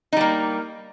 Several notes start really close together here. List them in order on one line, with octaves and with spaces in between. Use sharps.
D#4 G3 A#3